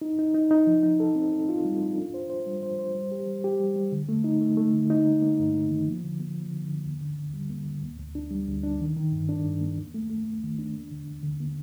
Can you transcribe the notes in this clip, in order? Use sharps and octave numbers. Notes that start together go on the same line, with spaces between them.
D#4
D#4
D#4
D#4
F3
D#4
A4
C4
A4
F4
G3
F4
D4
C5
C5
G3
C5
C5
G3
G4
G3
G4
G3
G3
D3
A3
D#4
A3
A3
D3
D#4
A#3
A#3
G2
D#4
D#3
F3
D3
A#3
F3
D3
D3
D#2
D3
D#2
G3
A#3
D3
D2
D2
D4
G3
D2
D4
D#3
D#3
G2
D4
G2
A#3
D#2
A3
A3
D#2
D#3
D4
D#2
D3
D#2
D3
A#3